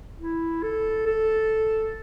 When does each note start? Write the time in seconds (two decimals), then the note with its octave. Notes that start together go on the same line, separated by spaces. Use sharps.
0.20 E4
0.63 A4
1.06 A4